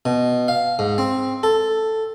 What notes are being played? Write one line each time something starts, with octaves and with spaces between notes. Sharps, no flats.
B2
F5
G#2
C4
A4